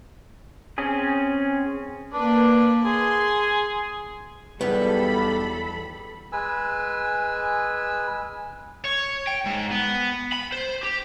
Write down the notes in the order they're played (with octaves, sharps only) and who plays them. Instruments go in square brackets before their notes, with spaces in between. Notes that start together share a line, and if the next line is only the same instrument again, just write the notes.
[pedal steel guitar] C4 C#4 G#4
[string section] A#3 B4 [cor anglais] D4
[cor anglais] G#4 [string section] C6
[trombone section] B1 G3 [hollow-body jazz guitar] E2 B3 [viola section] A4 B5
[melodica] G#3 B4 G#5 E6
[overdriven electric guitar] C#5
G5
G#2
B3
B5
C5
G4